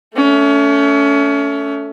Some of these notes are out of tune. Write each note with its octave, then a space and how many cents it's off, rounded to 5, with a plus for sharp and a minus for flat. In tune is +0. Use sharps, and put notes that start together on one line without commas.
A3 +0 C#4 +30